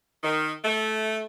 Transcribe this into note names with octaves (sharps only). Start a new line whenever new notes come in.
D#3
A3